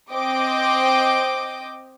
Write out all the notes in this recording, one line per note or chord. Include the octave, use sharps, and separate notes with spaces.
C4 D#5 G5 D6